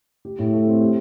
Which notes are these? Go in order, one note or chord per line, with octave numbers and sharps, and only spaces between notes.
G4
A2
A3
C4
G4